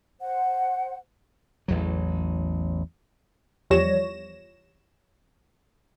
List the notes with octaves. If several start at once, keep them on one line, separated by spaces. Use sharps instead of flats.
C5 F#5
A1 E2 F#3
E2 F3 G3 C#5 A#6 E7